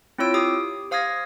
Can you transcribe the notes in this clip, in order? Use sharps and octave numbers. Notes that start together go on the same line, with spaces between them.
C4 E4 F4 C#5 E6 D7
G4 D6 D#6
C5 F5 D#6 F6 G#6 A#6